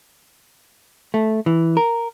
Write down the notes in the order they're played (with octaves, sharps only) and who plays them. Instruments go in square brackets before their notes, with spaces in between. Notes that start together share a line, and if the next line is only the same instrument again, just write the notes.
[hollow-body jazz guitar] A3
E3
A#4